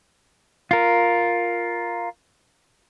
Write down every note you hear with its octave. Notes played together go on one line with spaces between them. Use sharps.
F4 A#4